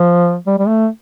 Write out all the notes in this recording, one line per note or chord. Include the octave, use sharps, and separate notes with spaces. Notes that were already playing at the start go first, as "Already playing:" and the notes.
Already playing: F3
G3
G3
A3